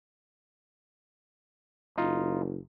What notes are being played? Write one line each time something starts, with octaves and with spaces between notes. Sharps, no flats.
F#1 D#4 F4